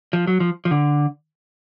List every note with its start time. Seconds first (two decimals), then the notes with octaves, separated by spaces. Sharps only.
0.13 F3
0.27 F#3
0.40 F3
0.65 F3
0.71 D3